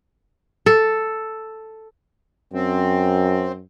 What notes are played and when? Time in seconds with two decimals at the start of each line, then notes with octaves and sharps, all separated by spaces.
0.66 A4
2.53 F#2 C4